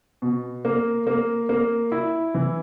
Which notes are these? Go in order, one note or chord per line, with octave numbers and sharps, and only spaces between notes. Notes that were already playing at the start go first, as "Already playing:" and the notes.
B2
A#3
A#3
A#3
E4
E3